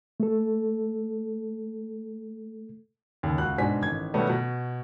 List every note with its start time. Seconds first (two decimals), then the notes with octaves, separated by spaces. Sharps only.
0.20 A3 A4
3.23 D#2 C#3
3.38 C#2 F#4 F#6
3.58 G#2 B2 D4 C5 G#5 B6
3.82 A1 D#3 G#6
4.14 B2 D#3 F#3 G3 A3 B3
4.29 B2